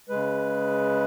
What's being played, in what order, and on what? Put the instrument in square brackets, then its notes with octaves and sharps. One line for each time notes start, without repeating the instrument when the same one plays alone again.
[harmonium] C#3 G#3 B4